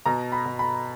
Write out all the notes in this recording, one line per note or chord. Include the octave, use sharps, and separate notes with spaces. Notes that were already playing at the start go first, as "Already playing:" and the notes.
B2 A#5
B5
B2
B5